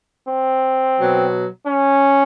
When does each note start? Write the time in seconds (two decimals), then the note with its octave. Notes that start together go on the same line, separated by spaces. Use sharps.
0.28 C4
0.97 B2 F#3
1.65 C#4